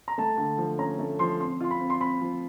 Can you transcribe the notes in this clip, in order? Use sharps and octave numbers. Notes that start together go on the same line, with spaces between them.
A#5
A3 A5
D3
F3
C#4 A#5
A3
F3 C6
C4 C6
F4 C6
B5
C4
C6
C4 B5
F3